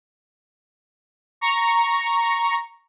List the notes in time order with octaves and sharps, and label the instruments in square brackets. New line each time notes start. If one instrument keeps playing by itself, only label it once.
[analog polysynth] A#5 C#6